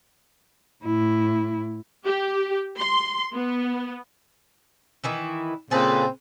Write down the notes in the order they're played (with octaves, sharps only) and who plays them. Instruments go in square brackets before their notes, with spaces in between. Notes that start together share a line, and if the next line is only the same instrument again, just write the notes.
[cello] A2 E4
[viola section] G4
C6
B3
[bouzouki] D#3 E3 E4
[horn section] A#2 C#3 C4 [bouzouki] G#4 A4 B4